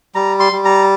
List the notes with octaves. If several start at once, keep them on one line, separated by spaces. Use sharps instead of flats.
G3 A#5
C6
G3
A#5